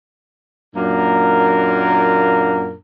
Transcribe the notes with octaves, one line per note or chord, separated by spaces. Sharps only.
F#2 A#2 A#3 D4 A#4